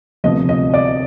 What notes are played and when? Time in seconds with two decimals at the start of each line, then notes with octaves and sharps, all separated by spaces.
0.24 D2 C3 F3 B3 D4 D#5
0.49 D#5
0.74 D5